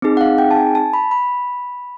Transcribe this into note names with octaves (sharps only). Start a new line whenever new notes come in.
C4 D#4 G#4
F#5
F5
G5
A5
G#5
A5
B5
B5